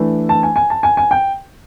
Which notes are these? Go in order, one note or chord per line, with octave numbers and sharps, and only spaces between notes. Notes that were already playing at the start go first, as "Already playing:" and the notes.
Already playing: E3 A3 D4
A5
G#5
G#5
A5
G#5
G#5
G5